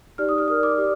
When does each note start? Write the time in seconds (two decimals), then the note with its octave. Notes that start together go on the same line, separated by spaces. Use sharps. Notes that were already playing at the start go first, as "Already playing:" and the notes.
0.18 D#4 G4 D5 F6
0.29 D#6
0.38 F6
0.48 D#4 A#4 D5 D#6
0.63 D6
0.78 G4 D5